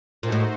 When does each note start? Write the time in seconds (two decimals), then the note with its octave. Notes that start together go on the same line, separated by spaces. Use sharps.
0.23 A#2 A3 D#4 F#4 C5
0.32 A2